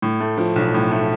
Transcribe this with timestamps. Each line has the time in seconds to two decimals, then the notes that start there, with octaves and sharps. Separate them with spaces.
0.02 A2
0.20 A3
0.37 F3
0.56 B1
0.74 A2
0.91 A3